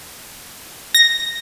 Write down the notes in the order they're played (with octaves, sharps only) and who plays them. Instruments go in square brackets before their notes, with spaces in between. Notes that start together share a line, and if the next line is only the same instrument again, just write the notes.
[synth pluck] A#6